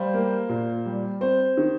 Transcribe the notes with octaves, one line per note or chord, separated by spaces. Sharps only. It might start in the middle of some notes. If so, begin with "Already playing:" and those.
Already playing: G3 C5 F5
A#3
A#2
G3
C4 C5
D#3